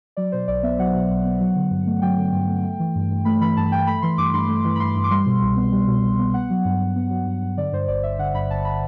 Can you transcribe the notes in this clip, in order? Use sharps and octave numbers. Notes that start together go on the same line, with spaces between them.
F#3 D5
B2 C5
B1 D5
B3 E5
F#3 F#5
B2
B1
B3
F#3
D3
G2
A3
F#3 G5
D3
G2
A3
A3
E3
G2
G2
A3 B5
E3 B5
G2 A5
G2 G5
A3 B5
E3 C6
G2 D6
G2 C6
A3
E3
B5
G2 C6
G2
D6
G3 C6
B2
C2
B3
G3
B2
C2
B3
B3 F#5
F#3
G2
G2
B3
F#3
G2
G2
D3 D5
G2 C5
G1 D5
G1 E5
D3 F#5
G2 B5
G1 A5
B5